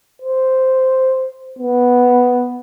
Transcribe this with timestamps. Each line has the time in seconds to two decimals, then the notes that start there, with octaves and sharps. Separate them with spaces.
0.22 C5
1.59 B3